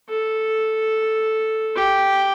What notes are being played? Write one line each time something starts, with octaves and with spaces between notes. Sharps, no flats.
A4
G4